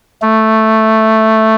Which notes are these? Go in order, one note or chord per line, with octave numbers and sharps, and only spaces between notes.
A3